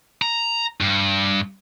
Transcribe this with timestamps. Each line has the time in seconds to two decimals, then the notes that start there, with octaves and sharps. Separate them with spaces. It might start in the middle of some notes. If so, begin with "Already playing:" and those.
0.22 A#5
0.81 G2